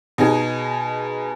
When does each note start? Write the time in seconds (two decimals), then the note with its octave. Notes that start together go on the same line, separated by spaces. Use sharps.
0.18 B2 D#4 G#4